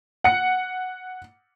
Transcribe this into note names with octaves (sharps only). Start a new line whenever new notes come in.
F#5 C#7